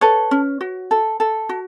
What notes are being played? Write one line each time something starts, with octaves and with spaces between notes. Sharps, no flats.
A4 B4 C#5
C#4
F#4
A4
A4
F#4